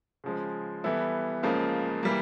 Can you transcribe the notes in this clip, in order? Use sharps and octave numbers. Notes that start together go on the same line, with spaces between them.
C#3 F3 G#3
E3 G3 B3 E4 A4
C#2 C#3 F3 A#3
E3 G3 A#3